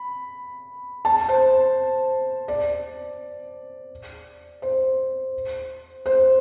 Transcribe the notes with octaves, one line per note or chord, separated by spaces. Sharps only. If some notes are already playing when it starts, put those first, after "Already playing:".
Already playing: B5
A5
C5
D5
C5
C5